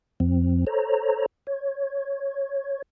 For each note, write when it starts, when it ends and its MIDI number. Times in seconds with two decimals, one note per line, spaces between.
0.20 0.65 41
0.20 0.65 53
0.20 0.65 60
0.67 1.26 69
0.67 1.26 72
0.67 1.26 73
0.67 1.26 82
1.47 2.82 73